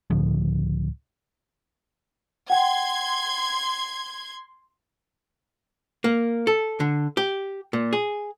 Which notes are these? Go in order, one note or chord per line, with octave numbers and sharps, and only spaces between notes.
C#2 A2 D3 F3
F#5 G5 C6 G#6
A#3
A4
D3
G4
A#2
G#4